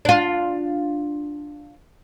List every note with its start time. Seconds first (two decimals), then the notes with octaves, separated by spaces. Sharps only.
0.05 D4 F4